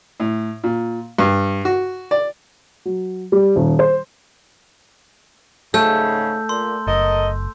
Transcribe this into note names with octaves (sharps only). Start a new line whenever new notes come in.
A2
A#2
G2
F#4
D5
F#3
G3
D#1
C5
G#2 C#3 A3 E6 G6
A#2 C6
F#1 A4 A#4 D#5